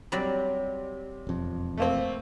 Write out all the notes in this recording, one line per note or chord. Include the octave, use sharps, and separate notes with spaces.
C3 F#3 G3 D5
E1 F2
A3 A#3 C4